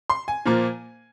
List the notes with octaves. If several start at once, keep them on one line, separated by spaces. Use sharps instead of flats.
C6
G#5
A#2 F3 A#3